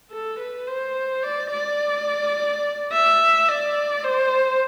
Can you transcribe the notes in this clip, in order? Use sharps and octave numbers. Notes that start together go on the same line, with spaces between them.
A4
B4
C5
D5
D5
E5
D5
C5